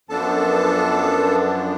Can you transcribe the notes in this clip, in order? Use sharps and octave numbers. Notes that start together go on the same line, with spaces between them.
F#2 F3 B3 D4 A4 A5